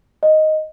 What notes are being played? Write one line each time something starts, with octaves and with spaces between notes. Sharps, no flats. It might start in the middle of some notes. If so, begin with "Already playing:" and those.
D#5